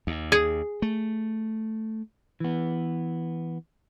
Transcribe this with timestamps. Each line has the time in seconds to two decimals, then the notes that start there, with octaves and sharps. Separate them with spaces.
0.07 D#2
0.32 G#4
0.82 A3
2.40 E3 B3